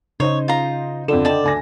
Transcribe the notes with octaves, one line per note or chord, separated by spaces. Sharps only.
C#3 D#4 C5 C#5 D#5
F4 A#5
F2 D3 F4 A4 E7
D5 D#5 G5 A5
D2 G#5 A#6